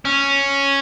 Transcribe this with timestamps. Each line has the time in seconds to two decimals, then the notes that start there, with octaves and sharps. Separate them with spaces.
0.05 C#4